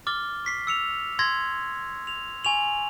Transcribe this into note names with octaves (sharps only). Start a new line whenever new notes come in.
D6 F6 A6 G7
C#6 B6 C7
E6 C#7 F7
C6 E6 G#6 A#6
F7
G#5 C#6 F7 F#7